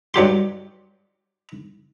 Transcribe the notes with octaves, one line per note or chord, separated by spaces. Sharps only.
G2 F#3 G4 C6